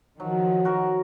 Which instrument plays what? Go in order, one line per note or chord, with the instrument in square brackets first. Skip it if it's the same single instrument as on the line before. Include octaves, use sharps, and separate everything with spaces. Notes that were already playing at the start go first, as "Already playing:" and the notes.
[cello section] D#3 F3 [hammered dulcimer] F#3
[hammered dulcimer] F#4 A#4